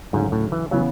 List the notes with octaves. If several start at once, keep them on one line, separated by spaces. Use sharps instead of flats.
D2 G#2 C#3 F#3
A2
E3
C#3 E3 F#3 B3